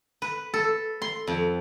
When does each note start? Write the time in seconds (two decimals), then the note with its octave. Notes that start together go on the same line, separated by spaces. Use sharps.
0.22 B4
0.54 A4
1.02 C6
1.28 F2